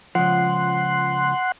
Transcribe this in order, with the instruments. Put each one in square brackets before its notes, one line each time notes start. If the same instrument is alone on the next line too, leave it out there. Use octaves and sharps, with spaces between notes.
[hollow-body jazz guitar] C#2 F3 [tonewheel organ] F#5 C6